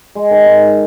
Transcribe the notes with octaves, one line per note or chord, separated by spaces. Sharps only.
G#3
D#3
G#2